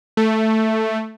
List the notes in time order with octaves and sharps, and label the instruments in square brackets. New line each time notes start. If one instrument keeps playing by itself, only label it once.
[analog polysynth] A3